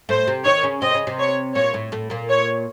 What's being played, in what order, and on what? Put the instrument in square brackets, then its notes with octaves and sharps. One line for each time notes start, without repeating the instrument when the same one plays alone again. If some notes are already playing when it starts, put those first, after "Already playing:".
[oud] A2 A3 [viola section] C5
[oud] C3 C4
[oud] D#3 D#4 [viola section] C#5
[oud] C#3 C#4
[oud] C3 C4 [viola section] D#5
[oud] C#3 C#4
C3 C4
[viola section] C#5
[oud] A#2 A#3 [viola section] C#5
[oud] A2 A3
A2 A3
A#2 A#3
[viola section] C#5